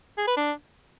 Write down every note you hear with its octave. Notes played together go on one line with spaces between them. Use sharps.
G#4
B4
D4